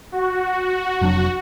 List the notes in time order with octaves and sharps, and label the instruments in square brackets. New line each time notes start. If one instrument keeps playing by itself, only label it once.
[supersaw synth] F#4
[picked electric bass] F1 F#3 D4